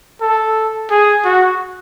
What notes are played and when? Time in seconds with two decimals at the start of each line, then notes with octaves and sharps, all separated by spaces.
0.21 A4
0.91 G#4
1.25 F#4